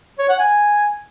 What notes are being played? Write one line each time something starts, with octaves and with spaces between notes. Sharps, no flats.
C#5
F#5
G#5